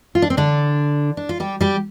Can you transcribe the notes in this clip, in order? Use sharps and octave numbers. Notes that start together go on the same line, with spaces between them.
F4
D4
C4
D3 D4
D4
F4
G3 G4
G3 G4